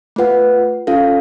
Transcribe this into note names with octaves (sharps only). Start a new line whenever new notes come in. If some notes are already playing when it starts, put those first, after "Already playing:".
A3 F4 B4 F#5
C#4 F4 A4 F5